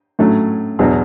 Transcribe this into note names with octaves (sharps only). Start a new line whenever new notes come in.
A2 F#3 A3 C#4
E2 B2 F#3